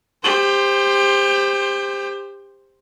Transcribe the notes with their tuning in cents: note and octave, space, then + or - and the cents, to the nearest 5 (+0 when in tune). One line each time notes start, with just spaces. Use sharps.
G4 +25 C5 +0